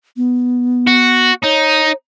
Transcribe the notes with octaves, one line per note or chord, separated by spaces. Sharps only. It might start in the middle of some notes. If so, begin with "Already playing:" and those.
B3
F#4
D#4 C#5